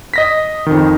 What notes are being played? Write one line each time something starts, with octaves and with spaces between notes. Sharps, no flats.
D#5 A#6 B6
F2 D#3